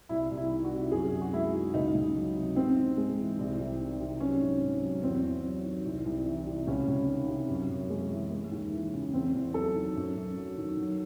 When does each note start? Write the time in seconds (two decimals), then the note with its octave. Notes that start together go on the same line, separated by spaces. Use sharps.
0.09 C2 E4
0.30 C2
0.37 E4
0.51 D#3
0.64 F#4
0.72 C3
0.91 F#2 G#4
1.12 F#2
1.21 F#4
1.33 G#3 E4
1.53 D#3
1.74 C#2 D#4
1.95 C#2
2.16 F#3
2.35 C3
2.56 G#2 C4
2.77 G#2
2.97 G#3
3.18 E3
3.39 C2
3.59 C2
3.79 D#3
4.00 C3
4.20 F#3 C#4
4.41 G#2
4.62 G#2
4.82 F#3
5.03 E2 C4
5.23 E2
5.44 F#3
5.65 D#3
5.85 C2
6.05 C2
6.26 E3
6.47 C3
6.67 C#2 C#4
6.88 C#2
7.08 D#3
7.28 C3
7.49 F#2
7.70 F#2
7.90 G#3
8.11 E3
8.31 G#3
8.52 D#2
8.73 E3
8.94 C#3
9.14 E2 C4
9.35 E2
9.54 F#3 A4
9.76 D#3
9.96 F#2
10.17 F#2
10.36 F#3
10.58 D#3
10.78 F#3